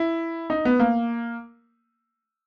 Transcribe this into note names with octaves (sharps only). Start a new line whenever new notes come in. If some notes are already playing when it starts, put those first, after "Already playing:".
Already playing: E4
D#4
B3
A#3